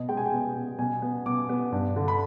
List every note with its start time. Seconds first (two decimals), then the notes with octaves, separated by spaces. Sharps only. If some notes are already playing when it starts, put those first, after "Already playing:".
Already playing: B2 D#5
0.09 G#3 G5
0.17 G#5
0.26 G5
0.33 B3
0.56 B2
0.79 B2 G#5
1.02 B3
1.26 B2 D6
1.49 B3
1.72 G2
1.96 D3
2.08 B5